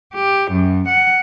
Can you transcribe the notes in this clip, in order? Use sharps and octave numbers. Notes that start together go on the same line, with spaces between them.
G4
F#2
F#5